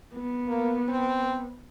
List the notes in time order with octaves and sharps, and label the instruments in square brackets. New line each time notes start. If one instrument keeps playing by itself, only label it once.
[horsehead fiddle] B3
[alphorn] A#3
C4